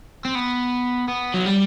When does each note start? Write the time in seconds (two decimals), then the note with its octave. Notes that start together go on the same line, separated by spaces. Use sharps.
0.25 C4
0.35 B3
1.08 B3
1.34 F#3
1.46 G3